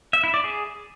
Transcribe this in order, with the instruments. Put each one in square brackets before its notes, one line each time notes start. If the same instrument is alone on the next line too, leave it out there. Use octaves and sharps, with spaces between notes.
[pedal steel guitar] E5
E4
D5
G#4